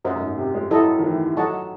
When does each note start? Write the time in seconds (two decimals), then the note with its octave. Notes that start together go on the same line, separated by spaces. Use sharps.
0.04 F#2 C5 D#5 F#5
0.16 F#2
0.21 G#2
0.38 C3
0.54 G#3
0.71 F#3 E4 A4 D#5
0.99 D#3
1.04 E3
1.37 F#3 A4 D#5 F#5 A5 C#6